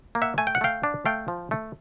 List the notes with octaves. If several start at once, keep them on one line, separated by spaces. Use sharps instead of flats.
A#3
E5 F#5
A3 G#5
G5
F#5
A3 F5 G5
D4
A3 F5 G5
F3
A3